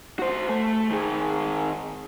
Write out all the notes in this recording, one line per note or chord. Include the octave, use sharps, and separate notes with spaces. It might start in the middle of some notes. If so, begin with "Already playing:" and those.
F#4 C5
A3
D#3 G#4